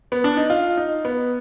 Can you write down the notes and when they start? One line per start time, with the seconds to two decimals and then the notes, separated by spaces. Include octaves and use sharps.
0.12 B3
0.24 D4
0.37 D#4
0.50 F4
0.77 D#4
1.05 B3